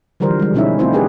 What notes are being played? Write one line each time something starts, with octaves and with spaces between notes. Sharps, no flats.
D3 E3 F3 G3 A#4 C5
G3 G#3
B2 G3 C#4 D#4 E4 E5
A3 C4 E4 F4 C5
A3 D4 G4 G#4 B4